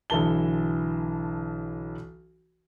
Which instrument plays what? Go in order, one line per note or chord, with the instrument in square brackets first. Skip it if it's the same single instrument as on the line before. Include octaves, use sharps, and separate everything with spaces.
[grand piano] B1 D3 E3 A5 G7